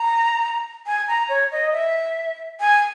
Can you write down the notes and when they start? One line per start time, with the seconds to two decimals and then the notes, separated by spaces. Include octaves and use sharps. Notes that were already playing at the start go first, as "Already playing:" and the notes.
Already playing: A#5
0.87 G#5
1.08 A#5
1.29 C#5
1.52 D#5
1.73 E5
2.60 G#5